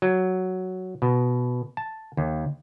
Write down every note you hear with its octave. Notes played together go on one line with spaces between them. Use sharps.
F#3
B2
A5
D#2